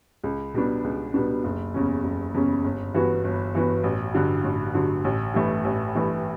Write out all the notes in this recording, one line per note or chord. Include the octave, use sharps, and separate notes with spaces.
C#2
B2 G3 B3 D4
C#2
B2 G3 B3 D4
F#1
E2 C#3 G3 C#4
F#1
E2 C#3 G3 C#4
G1
G2 E3 B3 F#4
G1
G2 E3 B3 F#4
A1
G2 D3 F#3
A1
G2 D3 F#3
A1
G2 E3 A3
A1
G2 E3 A3